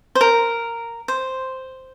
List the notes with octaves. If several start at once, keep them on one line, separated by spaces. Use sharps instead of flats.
C5
A#4
C5